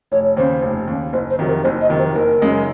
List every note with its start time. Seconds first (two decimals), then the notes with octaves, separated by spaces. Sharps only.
0.12 F1 C#5
0.37 D#2 C#3 C5
0.62 F1
0.87 D#2 C#3
1.13 F#1 C5
1.30 C5
1.39 F2 C3 D#3 F#3
1.48 A#4
1.64 F#1 C5
1.81 D#5
1.89 F2 C3 D#3 F#3
1.99 C5
2.15 F#1 A#4
2.41 F#2 C#3 G#3 D#4